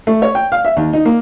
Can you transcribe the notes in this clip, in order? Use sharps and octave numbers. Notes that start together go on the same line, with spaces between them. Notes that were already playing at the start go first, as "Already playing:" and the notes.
A3
C#5
G5
F5
E5
D#2
D#4
A#3